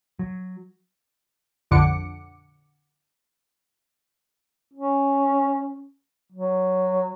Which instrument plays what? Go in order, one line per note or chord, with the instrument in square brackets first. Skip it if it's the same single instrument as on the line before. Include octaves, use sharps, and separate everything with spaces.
[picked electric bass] F#3
[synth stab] A#1 F2 D3 F#5 D6 C#7
[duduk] C#4
F#3